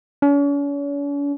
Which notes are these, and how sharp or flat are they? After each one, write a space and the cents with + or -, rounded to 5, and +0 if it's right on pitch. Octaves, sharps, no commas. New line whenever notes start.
C#4 +45